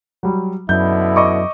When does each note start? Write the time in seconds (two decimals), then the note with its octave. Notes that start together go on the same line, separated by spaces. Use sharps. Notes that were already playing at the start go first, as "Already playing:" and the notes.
0.23 F#3 G3
0.69 F#2 B2 D3 E4 G6
1.16 D#5 C#6 D6